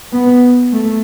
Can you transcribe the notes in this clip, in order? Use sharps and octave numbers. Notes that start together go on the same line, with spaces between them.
B3
A3